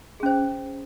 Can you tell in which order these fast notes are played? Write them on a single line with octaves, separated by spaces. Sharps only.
G#4 C#4 C5